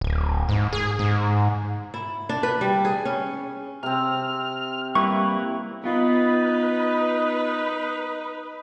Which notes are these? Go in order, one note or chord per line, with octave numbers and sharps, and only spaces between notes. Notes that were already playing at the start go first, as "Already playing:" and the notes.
D1
G#2
G#4
G#2
E4
D4
B4
G3
G#4
C#4
C3 C4 F6
G3 A#3 E4 B4 C#6
B3 D#4 F4 B4